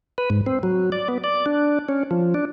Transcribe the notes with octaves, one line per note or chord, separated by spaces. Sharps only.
B4
G#2
C4
F#3
D5
B3
D5
D4
C#4
F3
D4